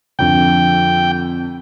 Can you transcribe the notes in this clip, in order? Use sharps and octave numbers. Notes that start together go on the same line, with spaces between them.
F2 D3 G5